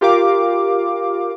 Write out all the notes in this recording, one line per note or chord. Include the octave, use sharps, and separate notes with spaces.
F4 G4 A#4 F5 D6